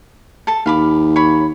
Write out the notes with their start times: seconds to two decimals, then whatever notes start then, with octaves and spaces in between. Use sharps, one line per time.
0.47 A4 A5
0.66 D#2 F5 B5 D6
1.16 C#5 B5